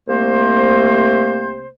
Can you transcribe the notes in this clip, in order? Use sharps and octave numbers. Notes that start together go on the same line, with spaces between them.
C2 C3 A3 A#3 C5